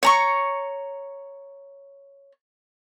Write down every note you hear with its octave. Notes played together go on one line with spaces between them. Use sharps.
C#5 A#5 C#6